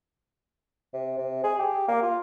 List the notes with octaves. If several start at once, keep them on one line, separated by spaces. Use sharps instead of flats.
C3
C3
G#4
G4
A#3
F4